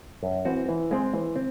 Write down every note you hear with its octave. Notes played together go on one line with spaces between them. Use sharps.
F#2
E3 C4 F#4
E3
G#3 C4
E3
C4